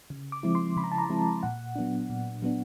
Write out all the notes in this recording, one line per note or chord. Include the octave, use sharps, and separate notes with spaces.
C#3
D6
F3 G#3 C4 E4
C6
C#3 B5
A#5
A5
A#5
F3 G#3 C4 E4
A#2 F#5
F#3 B3 D4
A#2
F#3 B3 D4